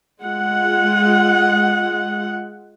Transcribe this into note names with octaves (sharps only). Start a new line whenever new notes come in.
G#3 F4 F#5